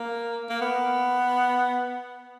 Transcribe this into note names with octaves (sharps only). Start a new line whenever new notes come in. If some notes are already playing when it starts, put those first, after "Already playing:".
Already playing: A#3
A#3
B3